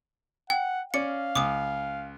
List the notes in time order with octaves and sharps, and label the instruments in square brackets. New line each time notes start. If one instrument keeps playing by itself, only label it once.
[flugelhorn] F#5 [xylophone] G5
[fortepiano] C#4 D5 [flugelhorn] F5 [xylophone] C#7
[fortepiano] C#2 [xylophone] D6 D#6